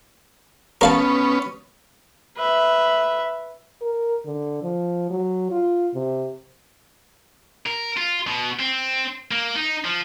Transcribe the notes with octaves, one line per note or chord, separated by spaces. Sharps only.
B3 C#4 A#4 F5 A5
B4 E5
A#4
D3
F3
F#3
F4
C3
A#4
F4
B2
C4
A#3
D#4
F3